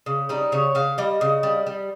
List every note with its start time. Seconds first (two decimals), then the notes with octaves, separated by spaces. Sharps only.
0.06 C#3
0.29 G3 D#4
0.52 C#3 C#5
0.75 C#3 F5
0.98 G3 D#5
1.21 C#3
1.43 G3
1.67 G3